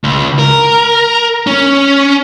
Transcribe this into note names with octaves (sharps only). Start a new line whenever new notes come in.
C#2
A#4
C#4